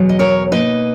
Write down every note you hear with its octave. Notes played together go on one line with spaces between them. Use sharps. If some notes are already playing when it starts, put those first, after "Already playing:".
Already playing: E2 B2 F#3
D#5
A#4 C#5
B2 A#3 D#4 B4 D#5